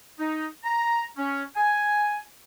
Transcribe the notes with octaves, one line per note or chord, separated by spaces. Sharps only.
D#4
A#5
C#4
G#5